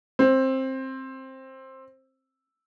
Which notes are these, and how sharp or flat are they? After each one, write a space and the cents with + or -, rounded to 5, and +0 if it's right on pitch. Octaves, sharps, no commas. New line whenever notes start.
C4 +15